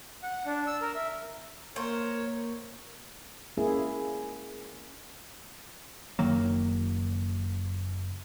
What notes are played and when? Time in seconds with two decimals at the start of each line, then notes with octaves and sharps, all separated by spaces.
0.23 F#5
0.46 D4
0.67 E6
0.81 A#4
0.96 E5
1.76 A#3 A#4 C5 C#5
3.57 G#3 A#3 C#4 E4 G#4
6.19 F#1 D#3 F#3 A#3